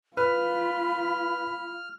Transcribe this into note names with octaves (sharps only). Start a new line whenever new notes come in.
F4 B4 B5 F6